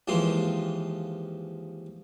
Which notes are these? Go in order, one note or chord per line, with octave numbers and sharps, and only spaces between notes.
D#2 E3 F3 G#3 C6